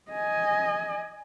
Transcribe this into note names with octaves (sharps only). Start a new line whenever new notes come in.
D#5 G#5